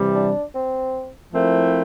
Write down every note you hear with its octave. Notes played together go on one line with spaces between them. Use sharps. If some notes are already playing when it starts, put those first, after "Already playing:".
Already playing: C3 E3 G3
D4
C4
F3 A3 A#3 C4 E4